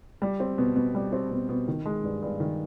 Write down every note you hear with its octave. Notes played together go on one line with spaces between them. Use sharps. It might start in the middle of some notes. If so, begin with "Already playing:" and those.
G3
C4
B2
B2
G3
C4
B2
B2
D#3
G#3
G2
G2
D#3